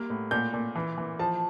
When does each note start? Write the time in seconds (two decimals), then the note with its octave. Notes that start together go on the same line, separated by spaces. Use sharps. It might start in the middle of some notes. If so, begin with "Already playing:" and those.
Already playing: G3 A#3
0.10 A2
0.31 A#2 G6
0.54 A#2
0.76 E3
0.98 E3
1.19 F3 A5